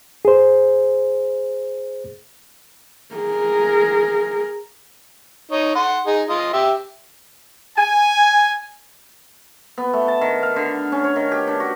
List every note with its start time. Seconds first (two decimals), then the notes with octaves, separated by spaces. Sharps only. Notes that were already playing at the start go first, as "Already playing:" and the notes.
0.25 G#4 C5
3.15 G#4 A#4
5.51 D#4 C#5
5.75 F#5 C6
6.07 D#4 G#4
6.29 F4 D#5
6.53 G4 E5
7.77 G#5
9.78 B3
9.93 A3
10.08 A5
10.21 D#3
10.43 F5
10.56 D3
10.92 C#4
11.04 C#5
11.16 D#3
11.32 G4
11.48 D4
11.60 F#4